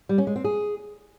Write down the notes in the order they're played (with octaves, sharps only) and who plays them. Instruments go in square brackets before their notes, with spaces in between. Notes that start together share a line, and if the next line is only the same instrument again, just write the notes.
[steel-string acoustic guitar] G3
C#4
G#3
C4
G#4